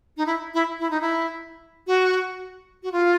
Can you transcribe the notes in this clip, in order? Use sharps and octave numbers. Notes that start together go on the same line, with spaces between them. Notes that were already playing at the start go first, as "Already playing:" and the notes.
D#4
E4
E4
E4
D#4
E4
F#4
F#4
F4